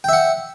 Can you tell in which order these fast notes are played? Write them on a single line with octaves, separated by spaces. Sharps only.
G5 E5 F#5